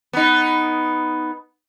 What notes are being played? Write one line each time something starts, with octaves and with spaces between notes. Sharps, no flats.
B3 D#4